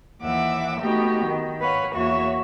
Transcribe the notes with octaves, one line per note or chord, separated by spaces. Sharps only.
D#2 E3 E5 F#5 D6 E6
A3 B3 D#4 F#4 G4
D#3
B4 C#5 F5 F#5
E2 A#3 F#4 C#5 E5 C#6